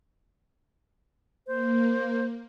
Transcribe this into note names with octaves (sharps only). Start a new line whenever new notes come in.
A#3 C5